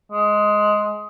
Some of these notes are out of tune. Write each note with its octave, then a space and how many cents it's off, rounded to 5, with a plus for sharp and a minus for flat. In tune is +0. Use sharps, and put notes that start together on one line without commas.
G#3 +10